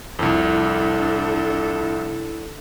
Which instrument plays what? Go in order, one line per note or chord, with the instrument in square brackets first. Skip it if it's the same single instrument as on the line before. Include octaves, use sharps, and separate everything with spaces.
[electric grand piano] C2 F2 [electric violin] D4 A4 [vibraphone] E4